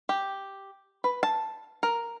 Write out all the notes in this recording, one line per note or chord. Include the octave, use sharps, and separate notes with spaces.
G4
B4
A5
A#4